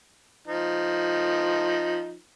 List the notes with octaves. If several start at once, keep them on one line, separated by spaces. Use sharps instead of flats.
F3 D#4